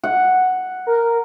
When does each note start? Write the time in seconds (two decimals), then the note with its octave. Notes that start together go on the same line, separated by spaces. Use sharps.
0.04 F#5
0.87 A#4